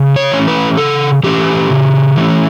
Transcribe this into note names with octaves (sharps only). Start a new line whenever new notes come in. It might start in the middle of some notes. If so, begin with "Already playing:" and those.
Already playing: C#3
C#5
E3 A3 C#4
B4
C#3 A4
E3 A3 C#4 G4
C#3
E3 A3 C#4